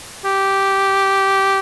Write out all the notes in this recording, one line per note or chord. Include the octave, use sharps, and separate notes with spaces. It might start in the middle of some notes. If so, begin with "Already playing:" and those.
G4